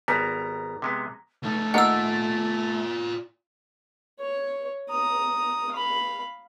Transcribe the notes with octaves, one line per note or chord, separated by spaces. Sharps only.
G#1 G3 B3 A#5
C3 G#3 B3
C#2 A3 D#4
D#3 A#3 F4 A#4 D5 F#5 E6
C#5
A#5 D#6
F5 B5